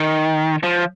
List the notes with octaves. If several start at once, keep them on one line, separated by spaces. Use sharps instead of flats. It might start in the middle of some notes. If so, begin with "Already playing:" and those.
Already playing: D#3
F3